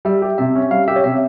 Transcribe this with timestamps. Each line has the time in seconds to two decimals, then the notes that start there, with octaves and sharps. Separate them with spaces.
0.05 G3 E5
0.22 G4
0.38 C3 E5
0.55 C#4
0.71 G3 F5
0.88 G4 E5
0.96 C#5
1.04 C3 E5